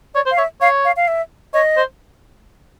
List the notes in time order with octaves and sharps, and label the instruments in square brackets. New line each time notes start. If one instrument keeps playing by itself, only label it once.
[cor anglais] C#5 [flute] D5
[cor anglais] C5
[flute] F5
[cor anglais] C#5 [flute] E5
[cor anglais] C#5 [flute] F5
[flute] F5
F5
E5
[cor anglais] C#5 [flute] D#5
[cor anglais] C5